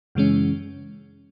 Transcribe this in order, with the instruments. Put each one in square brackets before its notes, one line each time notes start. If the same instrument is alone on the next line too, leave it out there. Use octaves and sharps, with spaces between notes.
[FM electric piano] F#2 C#3 E3 G#3 C#4